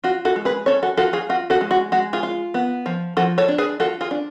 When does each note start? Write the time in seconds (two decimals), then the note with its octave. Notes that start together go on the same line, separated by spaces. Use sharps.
0.04 F4 F#4
0.25 F#4 A4
0.36 G#3
0.45 G#4 B4
0.66 C#4 A4 C#5
0.83 F#4 A4
0.97 F4 F#4 A4
1.13 F4 G#4
1.29 F4 F#4
1.50 F#4 A4
1.61 G#3
1.71 F#4
1.92 G#3 F#4
2.13 F4 G#4
2.23 F4
2.54 B3
2.86 F3
3.17 F3 F#4 A4
3.38 A4 C#5
3.48 D4
3.58 G#4 B4
3.80 F4 F#4 A4
4.01 F4 G#4
4.11 D4